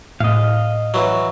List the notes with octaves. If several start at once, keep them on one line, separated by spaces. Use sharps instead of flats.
A2 D#5 F5
E3 F#3